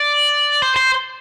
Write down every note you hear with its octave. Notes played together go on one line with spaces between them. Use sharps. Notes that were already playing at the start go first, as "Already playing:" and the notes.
Already playing: D5
C5
C5